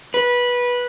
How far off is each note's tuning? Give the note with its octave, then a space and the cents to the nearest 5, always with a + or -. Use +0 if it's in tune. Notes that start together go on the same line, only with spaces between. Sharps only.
B4 -15